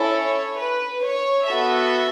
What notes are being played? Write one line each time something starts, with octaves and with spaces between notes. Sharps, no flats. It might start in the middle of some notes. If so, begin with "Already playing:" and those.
Already playing: C#4 E4 A4
C#5
B4
C#5
B3 F#4 A4 E5